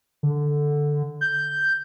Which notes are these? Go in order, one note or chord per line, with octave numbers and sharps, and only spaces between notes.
D3
G6